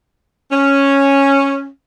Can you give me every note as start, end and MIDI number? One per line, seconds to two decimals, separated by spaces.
0.52 1.68 61